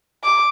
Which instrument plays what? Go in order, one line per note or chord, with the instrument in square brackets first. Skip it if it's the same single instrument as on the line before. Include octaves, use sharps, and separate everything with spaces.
[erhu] D6